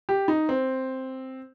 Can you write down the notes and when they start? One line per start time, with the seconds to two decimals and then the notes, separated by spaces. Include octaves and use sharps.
0.09 G4
0.28 D#4
0.49 C4